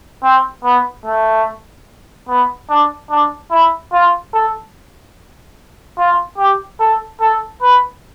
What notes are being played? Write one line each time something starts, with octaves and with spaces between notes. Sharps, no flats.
C4
B3
A3
B3
D4
D4
E4
F4
A4
F4
G4
A4
A4
B4